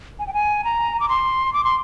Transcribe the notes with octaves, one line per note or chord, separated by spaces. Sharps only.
G#5
G5
G#5
A#5
D6
C6
D6
C6